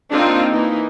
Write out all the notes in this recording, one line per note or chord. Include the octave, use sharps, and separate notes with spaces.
A#3 C4 D4 D#4 F4
E3 A#3 D#4